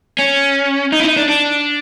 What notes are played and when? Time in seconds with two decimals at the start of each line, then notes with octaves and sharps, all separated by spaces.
0.18 C#4
0.92 D#4
1.00 E4
1.05 D#4
1.17 D4
1.29 D4